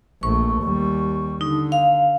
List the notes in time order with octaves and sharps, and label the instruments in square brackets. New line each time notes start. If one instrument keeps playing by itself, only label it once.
[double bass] A#1 A3 [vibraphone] C#6
[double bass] D#2 G3
[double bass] D3 [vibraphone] D#4
[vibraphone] F5